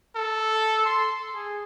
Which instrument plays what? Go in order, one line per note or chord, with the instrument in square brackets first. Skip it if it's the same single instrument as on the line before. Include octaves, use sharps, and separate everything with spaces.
[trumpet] A4
C6
G#4